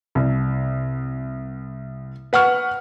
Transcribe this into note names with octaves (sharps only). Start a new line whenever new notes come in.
C2
B4 F#5 C#6 F6